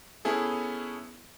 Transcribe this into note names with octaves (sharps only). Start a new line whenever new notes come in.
B3 C#4 E4 G#4 A4